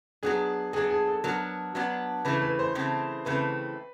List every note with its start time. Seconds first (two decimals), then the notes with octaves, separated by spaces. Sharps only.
0.23 F#3 B3 D4 G#4
0.73 F#3 B3 D4 G#4
0.90 G#4
1.07 A4
1.24 F#3 B3 D4 A#4
1.75 F#3 B3 D4
2.25 C#3 E3 A3 C4 B4
2.42 B4
2.59 C5
2.75 C#3 E3 A3 C4
3.26 C#3 E3 A3 C4 B4